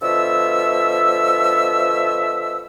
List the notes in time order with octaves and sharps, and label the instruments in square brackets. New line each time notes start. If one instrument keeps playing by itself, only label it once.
[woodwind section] B2 D3 F3 E5 E6